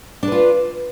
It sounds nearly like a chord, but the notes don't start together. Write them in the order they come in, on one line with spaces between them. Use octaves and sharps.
D4 B4 F4